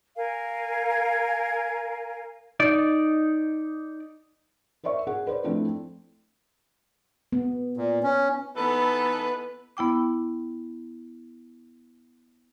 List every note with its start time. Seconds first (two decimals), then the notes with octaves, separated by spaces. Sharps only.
0.15 A#4 F5 G#5
2.60 D#4 D5
4.84 A#4 C5 D5 E5 C#6
5.07 G#4 F#5
5.27 B4 C5 D5
5.44 F3 A3 C4 D4 E4
7.32 B3
7.77 A#2
8.03 C#4
8.57 E3 B3 D#4 A4 B4
9.77 B3 E4 G5 D6